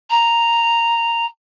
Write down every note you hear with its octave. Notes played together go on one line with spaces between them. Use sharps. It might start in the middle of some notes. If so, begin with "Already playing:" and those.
A#5